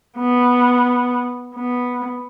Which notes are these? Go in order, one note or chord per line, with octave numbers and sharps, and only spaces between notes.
B3
B3